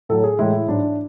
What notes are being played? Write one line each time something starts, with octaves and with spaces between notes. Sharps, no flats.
A2 F#3 A4
G#4
A2 E3 G#3 E4
G#2 F#3 D4